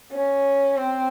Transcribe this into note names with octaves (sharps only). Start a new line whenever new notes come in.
C#4
C4